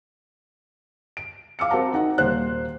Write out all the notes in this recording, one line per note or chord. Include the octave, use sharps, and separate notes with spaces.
D7
F5 D6 E6 C#7
C4 F#4 A#4 F#5 A5 A#5
D#4 F#5
D#1 A#3 C5 F#6